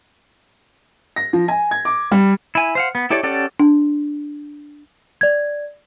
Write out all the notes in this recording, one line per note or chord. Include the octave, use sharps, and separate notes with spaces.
A#6
F3
G#5
G#6
D6
G3
E4 G#5
C5 F5 F#5
B3
E4 G4 A4 C#5 D5
C#4 G4 A4 D5 F#5
D4
D5 G#6